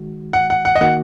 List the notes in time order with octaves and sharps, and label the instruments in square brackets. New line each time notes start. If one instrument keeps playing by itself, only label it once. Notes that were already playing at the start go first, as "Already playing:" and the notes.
Already playing: [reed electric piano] D#3 G#3 F#4
[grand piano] F#5
F#5
F#5
D#5
[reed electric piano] D#3 A#3 F#4 [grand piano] F#5